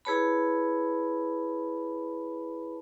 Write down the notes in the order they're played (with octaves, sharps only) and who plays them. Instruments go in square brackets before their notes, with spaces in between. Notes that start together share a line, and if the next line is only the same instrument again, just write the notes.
[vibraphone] E4 G#4 B4 C#5 A5 B5